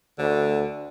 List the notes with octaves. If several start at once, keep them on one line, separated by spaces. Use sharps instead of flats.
D2 D3